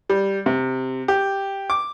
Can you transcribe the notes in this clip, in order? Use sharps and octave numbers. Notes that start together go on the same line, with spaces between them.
G3
C3
G4
D6